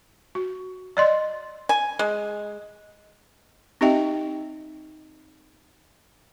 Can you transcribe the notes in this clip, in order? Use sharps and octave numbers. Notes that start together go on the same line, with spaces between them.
F#4
D5 D#5 C6
G#5
G#3
C4 D#4 G4 D#5 E5 G5